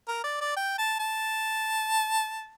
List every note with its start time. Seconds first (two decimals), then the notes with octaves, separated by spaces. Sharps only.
0.08 A#4
0.24 D5
0.41 D5
0.57 G5
0.78 A5
0.99 A5